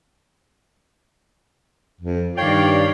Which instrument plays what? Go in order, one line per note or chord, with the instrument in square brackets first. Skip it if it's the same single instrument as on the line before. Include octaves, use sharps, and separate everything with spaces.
[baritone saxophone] F2
[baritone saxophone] G2 [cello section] D#3 D5 F5 [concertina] C#5 [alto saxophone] G5